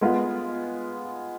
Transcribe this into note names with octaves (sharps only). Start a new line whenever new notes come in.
G#3 B3 F4